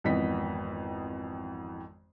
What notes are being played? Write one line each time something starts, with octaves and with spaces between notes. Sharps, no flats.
G#1 F2 E3 B3 D#5 B6